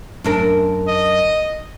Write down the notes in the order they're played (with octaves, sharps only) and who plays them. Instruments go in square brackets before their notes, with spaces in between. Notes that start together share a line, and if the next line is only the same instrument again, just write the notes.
[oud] F#2 D4 A#4
[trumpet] D#5